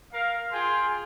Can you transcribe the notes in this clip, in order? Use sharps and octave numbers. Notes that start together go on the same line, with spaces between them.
A#4 F5
F4 G#4 G5 C6